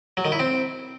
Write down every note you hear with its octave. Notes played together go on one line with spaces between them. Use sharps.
F#3
D#3
E4
C4